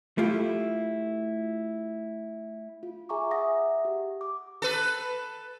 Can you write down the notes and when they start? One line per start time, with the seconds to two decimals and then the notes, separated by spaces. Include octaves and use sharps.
0.18 A3 E4 F4 G4
2.83 F4
3.09 G#4 E5 G#5 A#5 C#6 D6
3.31 E5 F#5 D#6 A#6
3.85 G4
4.21 D6
4.62 A4 B4